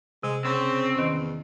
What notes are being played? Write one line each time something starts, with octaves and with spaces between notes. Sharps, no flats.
C3 G#3
C#3 C4
E2 D#3 C#4